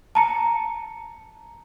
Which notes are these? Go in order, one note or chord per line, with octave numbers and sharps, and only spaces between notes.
A5 A#5 C#7